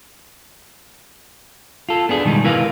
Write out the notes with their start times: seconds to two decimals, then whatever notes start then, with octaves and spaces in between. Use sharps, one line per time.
1.89 F4 A4
2.09 B3 D4 G#4
2.25 B2 D#3 G3 G#3 D#4
2.44 E4 A#4 B4 F5